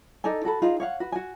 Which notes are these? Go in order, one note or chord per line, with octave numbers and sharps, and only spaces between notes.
D#4 A4 D5 G#5
F#4 A4 B5
D#4 F4 G#4
C#5 F5 F#5
F#4 B4
F#4 G#5